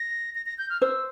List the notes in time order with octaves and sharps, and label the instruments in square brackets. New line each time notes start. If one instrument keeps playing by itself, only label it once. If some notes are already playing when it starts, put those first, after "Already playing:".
Already playing: [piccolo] A#6
A#6
A#6
G6
F6
[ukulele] C5 [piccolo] E6